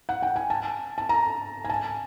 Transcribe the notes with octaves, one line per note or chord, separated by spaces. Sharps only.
F#5
G5
G#5
A5
A5
A#5
G#5
A5